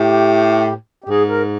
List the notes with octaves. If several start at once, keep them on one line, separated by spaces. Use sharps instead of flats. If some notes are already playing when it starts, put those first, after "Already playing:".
Already playing: A2 G4
G4
G#2 G#4
A#4